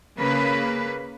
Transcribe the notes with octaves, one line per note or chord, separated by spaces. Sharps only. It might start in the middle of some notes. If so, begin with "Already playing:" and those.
C#3 A#3 B4